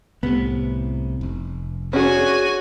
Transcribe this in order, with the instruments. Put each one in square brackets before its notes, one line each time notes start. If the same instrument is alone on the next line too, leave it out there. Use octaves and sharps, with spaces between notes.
[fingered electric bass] C2 A2 C3 [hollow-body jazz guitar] B3
[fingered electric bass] F1
[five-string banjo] C#4 D4 G#4 [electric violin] F#4 G#5